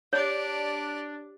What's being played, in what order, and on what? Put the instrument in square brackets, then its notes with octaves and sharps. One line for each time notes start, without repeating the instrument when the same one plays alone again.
[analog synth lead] D4 [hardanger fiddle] G4 D5 [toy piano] C#5